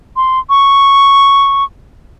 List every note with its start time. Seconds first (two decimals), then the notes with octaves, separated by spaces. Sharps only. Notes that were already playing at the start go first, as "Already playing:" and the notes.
0.16 C6
0.50 C#6